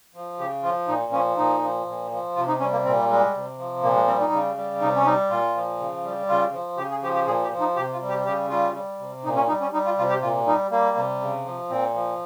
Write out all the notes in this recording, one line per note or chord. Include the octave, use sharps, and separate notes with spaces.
F3
C#3 G4
F3 F4
A#2 D#4
F3 C#4
A#2 D#4
F3
A#2
F3
C3 F4
D#4
G3 C#4
A#3
A#2 C4
G3 G#3
C3
F3
A#2 A#3
G#3
G3 C4
D#4
C#3
G3
C3 D#4
C#4
G3 D#4
A#2 F4
F3
C#3
G3
C#3 F4
F3
C#3 G4
G#4
F3 G4
G4
A#2 G#4
G4
F3
D#4
C3 G4
F4
G3
G4
C#3 G4
G3 F4
G3
C3
A#2 D#4
C#4
G3 D#4
C#4
G3 D#4
F4
C3 F4
G4
A#2 F4
G3 D#4
G3 A#3
C3
C#3
F3
A#2 C4
F3